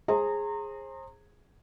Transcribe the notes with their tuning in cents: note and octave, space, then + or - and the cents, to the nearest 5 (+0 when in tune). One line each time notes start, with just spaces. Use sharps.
G#4 -5 C5 +30 A#5 -25